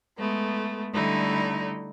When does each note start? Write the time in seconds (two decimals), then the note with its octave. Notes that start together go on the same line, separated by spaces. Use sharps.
0.17 G#3 A3 B3
0.93 D3 G3 A3 D#4 E4